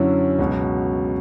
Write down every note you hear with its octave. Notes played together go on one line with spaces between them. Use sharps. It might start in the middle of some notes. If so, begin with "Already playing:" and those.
Already playing: F#2 D3 F#3 C#4 E4
C#2 B2 F#3